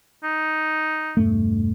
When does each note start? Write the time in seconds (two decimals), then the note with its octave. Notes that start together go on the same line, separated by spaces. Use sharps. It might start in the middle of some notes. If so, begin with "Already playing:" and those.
0.24 D#4
1.17 E1 G2 A3